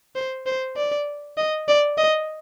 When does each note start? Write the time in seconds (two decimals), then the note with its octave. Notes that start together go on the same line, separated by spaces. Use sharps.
0.15 C5
0.46 C5
0.77 D5
1.37 D#5
1.68 D5
1.98 D#5